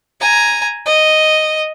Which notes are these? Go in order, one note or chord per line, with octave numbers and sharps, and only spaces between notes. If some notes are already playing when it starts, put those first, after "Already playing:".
G#5 A#5
D#5